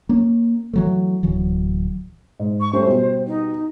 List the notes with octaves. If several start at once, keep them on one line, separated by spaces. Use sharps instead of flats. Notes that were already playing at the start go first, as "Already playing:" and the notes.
A#3 C#4
E3 F#3 A3
D1 E3 F#3
G#2
C#6
G3 A3 C#4 C5
B2 G3
D#4